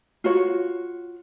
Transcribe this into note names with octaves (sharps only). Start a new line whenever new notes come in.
F4 F#4 C#5